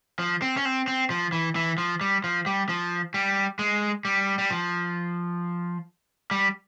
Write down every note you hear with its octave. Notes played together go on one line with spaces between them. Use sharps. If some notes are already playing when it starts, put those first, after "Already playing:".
F3
C4
C#4
C4
C4
F3
E3
E3
F3
G3
F3
G3
F3
G3
G#3
G3
G3
F3
G3